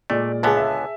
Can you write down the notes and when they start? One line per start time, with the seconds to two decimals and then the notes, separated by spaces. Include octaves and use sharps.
0.10 A#2 G#3 A3 D5
0.43 C#2 D3 B3 G#4 G#5 A5
0.57 E5